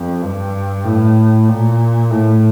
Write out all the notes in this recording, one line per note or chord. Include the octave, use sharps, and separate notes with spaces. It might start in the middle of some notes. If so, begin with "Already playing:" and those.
Already playing: F2
G2
A2
A#2
A2